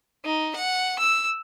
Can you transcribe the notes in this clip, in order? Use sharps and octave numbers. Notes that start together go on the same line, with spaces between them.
D#4
F#5
E6